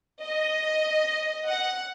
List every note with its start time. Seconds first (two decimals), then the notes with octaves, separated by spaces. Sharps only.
0.22 D#5
1.47 F#5